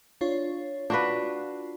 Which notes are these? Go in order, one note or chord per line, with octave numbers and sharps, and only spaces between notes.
D4 F4 C#5
D4 F4 F#4 B4